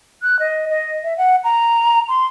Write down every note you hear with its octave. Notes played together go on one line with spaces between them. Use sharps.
F#6
D#5
D#5
E5
F#5
A#5
C6